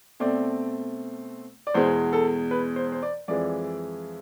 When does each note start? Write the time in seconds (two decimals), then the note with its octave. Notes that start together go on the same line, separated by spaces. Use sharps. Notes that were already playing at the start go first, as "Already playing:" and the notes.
0.20 B2 A3 C4 D5
1.67 D5
1.74 E2 B2 G#3 C5
2.13 A4
2.51 B4
2.76 C5
2.92 C5
3.03 D5
3.28 F2 E3 G#3 D5